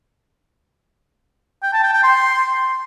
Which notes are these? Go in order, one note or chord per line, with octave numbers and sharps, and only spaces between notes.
G5
A5
G5
G5
C6